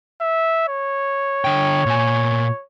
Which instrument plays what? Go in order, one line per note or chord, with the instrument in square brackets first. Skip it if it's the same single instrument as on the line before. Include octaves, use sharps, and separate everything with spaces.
[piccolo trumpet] E5
C#5
[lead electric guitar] D3 G5
A#2 G#5